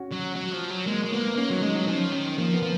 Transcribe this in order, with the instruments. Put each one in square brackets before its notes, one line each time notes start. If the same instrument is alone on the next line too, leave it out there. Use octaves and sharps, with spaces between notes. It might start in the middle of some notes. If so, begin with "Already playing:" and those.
Already playing: [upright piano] C#4 F#4
[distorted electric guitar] F#3
F#3
F3
F#3
[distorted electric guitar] G#3 [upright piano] A#3
[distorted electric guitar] G#3
[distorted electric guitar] A#3 [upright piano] B3
[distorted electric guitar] A#3 [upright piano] C#4
[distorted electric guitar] F#3 [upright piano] D#4
[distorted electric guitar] G#3
[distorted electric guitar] F#3 [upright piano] D#4
[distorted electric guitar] F3 [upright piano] C#4
[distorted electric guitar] D#3
[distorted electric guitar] F3 [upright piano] A#3
[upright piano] B3
[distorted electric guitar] F3